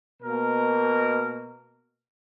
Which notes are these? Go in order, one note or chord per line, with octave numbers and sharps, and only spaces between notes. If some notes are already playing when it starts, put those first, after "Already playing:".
B2 A#3 A#4